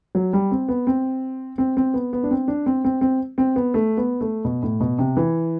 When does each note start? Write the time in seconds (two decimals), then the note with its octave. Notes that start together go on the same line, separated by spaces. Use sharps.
0.15 F#3
0.33 G3
0.51 C4
0.69 B3
0.87 C4
1.58 C4
1.77 C4
1.94 B3
2.13 B3
2.23 D4
2.31 C4
2.48 D4
2.66 C4
2.84 C4
3.01 C4
3.38 C4
3.56 B3
3.74 A3
3.97 B3
4.21 A3
4.45 B2
4.63 A2
4.80 B2
4.99 C3
5.17 E3